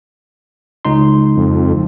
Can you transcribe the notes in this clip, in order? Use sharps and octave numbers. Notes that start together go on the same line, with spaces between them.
C#2 D#4 C6
F2